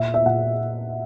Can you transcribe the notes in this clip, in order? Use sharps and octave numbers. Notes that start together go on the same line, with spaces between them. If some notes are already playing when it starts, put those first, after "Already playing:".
Already playing: A#2 E5
E5
A#2 F#5